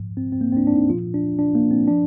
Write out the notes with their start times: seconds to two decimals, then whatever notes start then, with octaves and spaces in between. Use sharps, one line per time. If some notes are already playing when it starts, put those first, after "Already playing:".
Already playing: G#2 F3
0.17 C4
0.32 C4
0.41 A#3
0.52 C4
0.57 D4
0.67 D4
0.74 D#4
0.89 F3 F4
0.94 A#2
1.14 D4
1.39 D4
1.55 A#3
1.71 C4
1.88 F3 D4